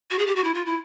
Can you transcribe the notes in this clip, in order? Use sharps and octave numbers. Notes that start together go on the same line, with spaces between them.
F#4
G#4
G4
F#4
E4
F4
E4